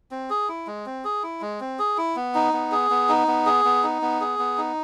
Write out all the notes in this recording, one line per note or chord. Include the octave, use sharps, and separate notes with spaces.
C4
G#4
E4
G#3
C4
G#4
E4
G#3
C4
G#4
E4
B3
D#4
B3
G#4
B3
D#4
B3
G#4
B3
D#4
B3
G#4
B3
D#4